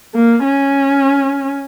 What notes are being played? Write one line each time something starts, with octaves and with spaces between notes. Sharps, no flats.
A#3
C#4